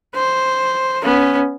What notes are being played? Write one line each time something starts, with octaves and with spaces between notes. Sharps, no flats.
C5
B3 C#4